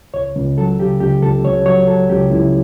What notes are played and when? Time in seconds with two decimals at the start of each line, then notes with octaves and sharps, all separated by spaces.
0.14 C#2 C#5
0.36 C#2
0.58 F#3 A4
0.79 C#3 G4
1.01 C#2 G4
1.22 C#2 A4
1.44 C#2 C#5
1.66 F#3 C#5
1.88 F#3 A4
2.09 C#2 G4
2.30 C#2 E4